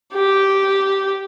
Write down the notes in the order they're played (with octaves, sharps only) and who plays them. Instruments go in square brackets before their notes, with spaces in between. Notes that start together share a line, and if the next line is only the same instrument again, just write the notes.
[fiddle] G4